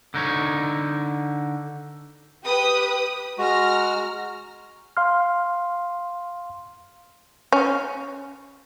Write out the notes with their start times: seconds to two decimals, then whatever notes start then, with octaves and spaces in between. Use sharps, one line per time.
0.14 D3 D#4 C#5
2.44 G4 B4 D#6
3.38 G#3 F#4 A#5 F6
4.97 F5 C6 F6
7.52 C#4